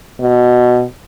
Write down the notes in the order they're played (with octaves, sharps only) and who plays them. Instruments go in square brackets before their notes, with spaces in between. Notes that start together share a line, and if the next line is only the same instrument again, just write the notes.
[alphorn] B2